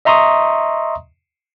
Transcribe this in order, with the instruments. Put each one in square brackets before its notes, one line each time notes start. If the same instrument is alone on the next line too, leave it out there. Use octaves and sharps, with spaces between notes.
[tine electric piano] D#5 E5 A#5 C6 C#6 D#6